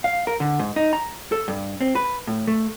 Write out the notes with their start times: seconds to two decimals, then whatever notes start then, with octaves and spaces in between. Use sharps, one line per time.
0.04 F5
0.27 A#4
0.40 D3
0.59 G#2
0.76 D#4
0.93 A#5
1.32 A4
1.48 G2
1.81 C4
1.95 B4
2.27 A2
2.47 A3